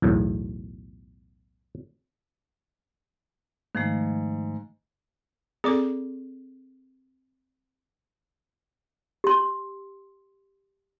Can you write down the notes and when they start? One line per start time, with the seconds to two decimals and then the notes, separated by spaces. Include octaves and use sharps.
0.02 B1 E2 A2
3.75 G#2 D#3 F3 A3
5.64 C4 G#4 A4 D5 D6
9.24 G4 C6